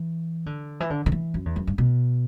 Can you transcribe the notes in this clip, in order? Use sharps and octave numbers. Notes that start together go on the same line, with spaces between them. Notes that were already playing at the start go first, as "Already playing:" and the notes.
Already playing: E3
D3
E3
D3
D3
E3
F#2
E2
F#2
G2
B2